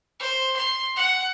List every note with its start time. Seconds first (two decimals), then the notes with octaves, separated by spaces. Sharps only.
0.20 C5
0.56 C6
0.96 F#5